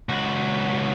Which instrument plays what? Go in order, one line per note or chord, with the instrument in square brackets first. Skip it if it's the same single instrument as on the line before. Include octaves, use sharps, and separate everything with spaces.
[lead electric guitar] C#2 F#4